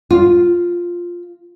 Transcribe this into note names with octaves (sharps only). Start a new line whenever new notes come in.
F4